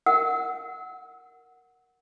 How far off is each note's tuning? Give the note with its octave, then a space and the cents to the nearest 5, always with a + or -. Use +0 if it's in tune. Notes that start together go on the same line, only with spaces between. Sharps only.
A#4 +0 F#5 +0 E6 -35